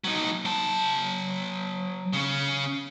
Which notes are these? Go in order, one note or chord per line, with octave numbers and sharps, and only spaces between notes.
F#3 D#4
F#3 A5
C#3 C#4